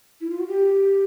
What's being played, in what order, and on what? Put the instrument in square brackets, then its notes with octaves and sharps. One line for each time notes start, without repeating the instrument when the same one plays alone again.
[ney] E4
F4
F#4
G4